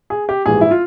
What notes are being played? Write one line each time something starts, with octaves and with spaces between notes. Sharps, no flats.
G#4
G4
A#1 G#2 E3 G3 G#4
E4
F4